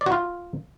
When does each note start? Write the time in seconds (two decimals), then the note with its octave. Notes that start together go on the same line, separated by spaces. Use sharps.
0.01 D5
0.06 F#4
0.12 F4